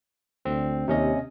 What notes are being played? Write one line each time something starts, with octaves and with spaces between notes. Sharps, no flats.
D2 C4
D#2 C3 C#4 D#5